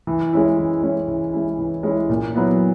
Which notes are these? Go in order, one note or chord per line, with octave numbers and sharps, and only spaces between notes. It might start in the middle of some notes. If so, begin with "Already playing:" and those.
E3
G#3 C#4 E4
E3
G#3 C#4 E4
E3
G#3 C#4 E4
E3
G#3 C#4 E4
A#2
F#3 B3 E4